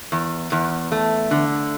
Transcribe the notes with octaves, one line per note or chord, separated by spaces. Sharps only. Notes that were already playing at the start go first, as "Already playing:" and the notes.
E2
E2
A3
D3